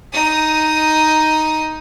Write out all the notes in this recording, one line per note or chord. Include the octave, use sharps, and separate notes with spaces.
D#4 D#6